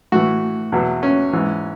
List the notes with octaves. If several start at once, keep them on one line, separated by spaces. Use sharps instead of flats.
A2 E3 F#4
E2 B2 F#3
C#4
G#2 E3